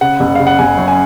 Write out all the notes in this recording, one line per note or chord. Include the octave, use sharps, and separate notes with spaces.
C#3 F#5
F#1
C#3 F5
F#5
F#1 G#5
F#2
G#5